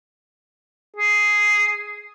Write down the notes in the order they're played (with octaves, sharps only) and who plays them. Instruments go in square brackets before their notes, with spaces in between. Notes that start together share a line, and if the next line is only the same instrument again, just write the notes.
[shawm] G#4